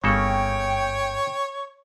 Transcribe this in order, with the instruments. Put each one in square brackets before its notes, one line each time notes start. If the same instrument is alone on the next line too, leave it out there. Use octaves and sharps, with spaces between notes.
[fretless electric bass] G1 [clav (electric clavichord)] C#3 A#3 A4 [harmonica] C#5 [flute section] G5